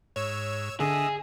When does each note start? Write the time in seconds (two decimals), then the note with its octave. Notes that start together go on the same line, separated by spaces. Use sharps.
0.16 G#2 C#5 E6
0.80 D3 G#4 D#5 E5